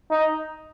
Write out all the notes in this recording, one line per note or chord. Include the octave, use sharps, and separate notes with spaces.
D#4